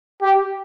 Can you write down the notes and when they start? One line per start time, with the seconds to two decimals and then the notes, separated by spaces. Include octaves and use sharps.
0.22 G4